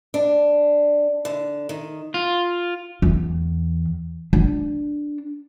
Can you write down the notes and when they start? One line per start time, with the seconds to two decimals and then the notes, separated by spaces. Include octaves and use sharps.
0.14 D4
1.25 D3
1.69 D#3
2.14 F4
3.02 E2
4.33 D4